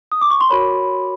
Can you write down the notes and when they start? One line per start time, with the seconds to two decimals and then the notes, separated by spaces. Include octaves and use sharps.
0.12 D#6
0.21 D6
0.31 C#6
0.41 C6
0.50 F#4 A#4 C#5 B5